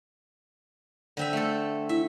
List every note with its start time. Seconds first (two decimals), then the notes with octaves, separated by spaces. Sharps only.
1.17 D3 C4 E5
1.33 A3 A4
1.89 E4 E5